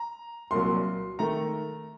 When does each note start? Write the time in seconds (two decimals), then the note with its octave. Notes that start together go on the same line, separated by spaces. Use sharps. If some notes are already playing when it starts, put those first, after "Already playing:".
Already playing: A#5
0.51 C2 A#2 F#3 C6
1.19 D#3 A3 A#5